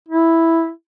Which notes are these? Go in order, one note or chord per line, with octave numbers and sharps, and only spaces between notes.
E4